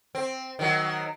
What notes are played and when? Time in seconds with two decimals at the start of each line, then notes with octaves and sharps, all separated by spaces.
0.15 C4
0.59 D#3 F#3